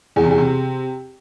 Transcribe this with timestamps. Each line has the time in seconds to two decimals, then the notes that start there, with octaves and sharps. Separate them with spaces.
0.16 E2
0.23 C3
0.31 E2
0.38 C3